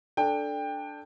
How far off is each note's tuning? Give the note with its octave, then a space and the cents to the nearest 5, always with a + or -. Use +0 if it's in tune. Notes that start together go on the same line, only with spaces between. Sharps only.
D4 +0 A4 +0 G5 +20